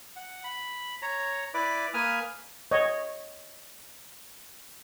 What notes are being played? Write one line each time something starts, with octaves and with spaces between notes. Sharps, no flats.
F#5
B5
C#5 A#5
E4 B4 D5 D6
A#3 B4 G#5 D#6 F6
C#5 D#5